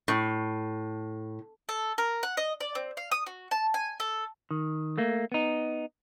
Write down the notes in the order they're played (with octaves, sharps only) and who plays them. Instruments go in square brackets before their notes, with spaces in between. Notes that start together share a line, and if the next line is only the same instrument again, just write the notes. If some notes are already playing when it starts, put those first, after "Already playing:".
[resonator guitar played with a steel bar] A2
[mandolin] A4
A#4
F#5
D#5
D5
C4
F5
D#6
F#4
A5
G#5
A4
[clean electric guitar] D#3
A3 A#3
B3 D#4